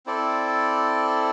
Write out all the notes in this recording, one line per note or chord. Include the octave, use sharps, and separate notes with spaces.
C4 E4 A4 D5